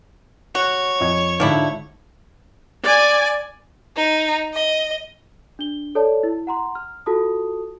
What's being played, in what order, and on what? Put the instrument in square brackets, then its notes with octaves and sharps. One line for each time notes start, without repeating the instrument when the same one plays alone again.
[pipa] F#4 [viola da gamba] C#5
[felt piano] F2 D#5 G#6
[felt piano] G#2 D3 [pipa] F3 D4 E4
[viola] D5 G#5
[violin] D#4
D#5
[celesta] D4 G7
A4 C#5 D5 A5
E4
F#5 A#5 C6
F6
F4 F#4 A4 A5 D#6